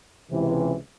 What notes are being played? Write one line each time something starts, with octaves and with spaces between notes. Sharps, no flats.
C#2 C3 E3